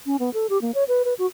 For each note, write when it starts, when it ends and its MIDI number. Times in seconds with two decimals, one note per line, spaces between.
0.06 0.17 61
0.20 0.33 59
0.34 0.47 69
0.50 0.60 67
0.62 0.72 58
0.75 0.84 73
0.88 1.03 71
1.05 1.14 71
1.19 1.26 66